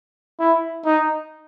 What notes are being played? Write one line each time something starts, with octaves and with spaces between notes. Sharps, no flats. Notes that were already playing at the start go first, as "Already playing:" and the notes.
E4
D#4